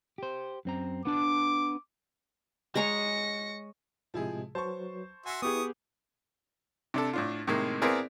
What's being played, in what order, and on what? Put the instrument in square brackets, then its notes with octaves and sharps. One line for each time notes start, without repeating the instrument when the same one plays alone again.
[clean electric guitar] G4 C5
F#2 C4 A#5
[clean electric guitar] B3 D4 A5 [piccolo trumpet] D6
[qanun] G#3 C#5 A#5 [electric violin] A#6 C#7
[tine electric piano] A2 C3 G#3 [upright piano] F3 E4 G#4
[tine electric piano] F#3 F#4 B4 [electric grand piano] C5 [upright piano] A5 C#6
[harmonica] F#4 E5 C6 [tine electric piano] G#5 E6
[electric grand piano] B3 G4 G#4 [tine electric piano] E4 B4 [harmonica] C#6 D#6
[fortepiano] C3 D4 A4
A2 D4 F4
A2 C3 D#3 G#3 A#3
B3 C4 E4 G#4 A#4 D5